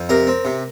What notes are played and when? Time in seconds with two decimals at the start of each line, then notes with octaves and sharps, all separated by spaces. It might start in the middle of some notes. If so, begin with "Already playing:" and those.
Already playing: F2
0.09 C3 A#4
0.27 C4
0.45 C3